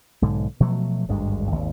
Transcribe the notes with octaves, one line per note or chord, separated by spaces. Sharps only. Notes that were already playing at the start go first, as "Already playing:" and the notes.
B1 G#2 D3
B2 F3 F#3 A3
G#1 D2 G2 G#3
G#1 D#2